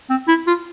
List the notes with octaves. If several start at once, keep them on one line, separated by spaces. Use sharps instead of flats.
C4
E4
F4